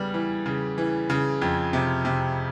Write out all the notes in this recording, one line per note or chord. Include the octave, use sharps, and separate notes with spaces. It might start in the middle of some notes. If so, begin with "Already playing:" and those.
Already playing: C#3 G3 B3
E3
C#3
E3
C#3
F2
C3
C3